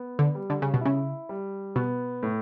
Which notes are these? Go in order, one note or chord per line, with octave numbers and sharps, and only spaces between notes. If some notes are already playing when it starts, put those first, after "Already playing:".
Already playing: B3
D3
G3
D3
C#3
B2
C#3 E4
G3
B2 B3
A2